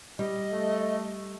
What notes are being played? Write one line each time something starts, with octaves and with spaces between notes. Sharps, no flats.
G3 D#5
A3